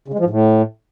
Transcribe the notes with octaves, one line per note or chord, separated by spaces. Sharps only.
C#3
G#3
F3
G#2
A2